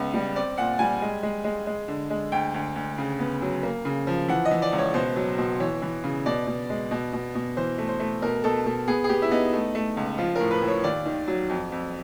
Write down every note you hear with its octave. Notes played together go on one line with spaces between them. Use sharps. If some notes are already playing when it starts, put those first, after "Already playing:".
Already playing: C#2 B3
G3
C4 D5
A#2 F#5
G3 G#5
G#3
G#3
G#3
G#3
D3
G#3
D2 G5
D2
D2
C#3
B3
F#3
A#3
C#3
F3
E3 F#5
D#5
E3
D5
C#2
C#5
B2 C5
F#3
B2
E3 C#5
E3
C#3
B2 D5
B2
G#3
B2
B2
B2
E3 C5
A3
C5
A3
B2 A#4
B2 A4
B2 A4
B3 G#4
G#4
B3 G4
E4
B3 D#4
A3
A3
C#2
F3 F4
A2 A#4
B4
A2
C#5
D#2 D5
D#3
F#3
F2
F2